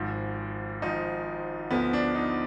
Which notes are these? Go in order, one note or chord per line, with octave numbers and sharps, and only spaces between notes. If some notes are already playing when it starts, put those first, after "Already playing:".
Already playing: G#1 G#2 F3
G#1 G#2 F3 D#4
D2 D3 F3 B3
D4
D#4